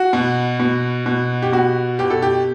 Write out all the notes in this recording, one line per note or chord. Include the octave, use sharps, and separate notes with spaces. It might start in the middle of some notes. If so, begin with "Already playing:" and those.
Already playing: F#4
B2
B2
B2
G4
B2 F#4
B2 G4
A4
G4